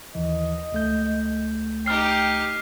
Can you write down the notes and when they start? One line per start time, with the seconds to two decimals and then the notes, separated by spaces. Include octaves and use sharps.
0.15 D#2 D#3 E3 D#5
0.72 C#2 A3 G6
1.86 D#4 G4 G5 F6 C7